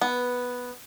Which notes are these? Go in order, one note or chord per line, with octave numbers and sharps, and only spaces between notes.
B3